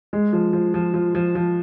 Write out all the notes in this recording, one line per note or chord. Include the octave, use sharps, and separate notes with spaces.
G#3
F3
F3
F3
F3
F3
F3